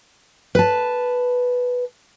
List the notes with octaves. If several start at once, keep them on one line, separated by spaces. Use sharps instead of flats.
B4 A5